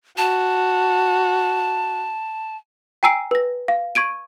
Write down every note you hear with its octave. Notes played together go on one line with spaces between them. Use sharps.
F#4 A5
G5 G#5 A#5 E6 C7 D7
B4 A#6
F5
C#6 G#6 D7 D#7